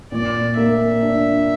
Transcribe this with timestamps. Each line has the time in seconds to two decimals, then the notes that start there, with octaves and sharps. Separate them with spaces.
0.12 A#2 D5
0.57 A#3 E5
1.02 D4